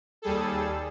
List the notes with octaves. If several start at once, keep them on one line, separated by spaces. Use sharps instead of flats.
D#2 G3 G#4 A4